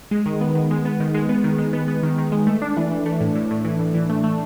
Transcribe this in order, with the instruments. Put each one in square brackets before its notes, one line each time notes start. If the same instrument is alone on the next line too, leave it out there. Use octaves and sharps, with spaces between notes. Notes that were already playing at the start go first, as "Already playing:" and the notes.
[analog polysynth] G#3
D#3
B3
D#3
G#3
B3
D#3
G#3
B3
D#3
G#3
B3
B3
D#3
D#3
G#3
A3
D4
E3
E3
A3
A2
A2
A2
E3
A2
E3
A3
A3